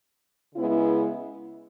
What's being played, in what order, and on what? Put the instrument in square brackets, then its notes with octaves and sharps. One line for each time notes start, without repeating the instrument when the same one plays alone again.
[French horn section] C#3 G#3 B3 E4